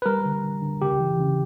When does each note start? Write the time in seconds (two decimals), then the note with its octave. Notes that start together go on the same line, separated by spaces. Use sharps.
0.02 B4
0.06 G3 A#4
0.25 D3
0.44 D3
0.62 D3
0.82 C#3 G4
1.00 E3
1.20 C#3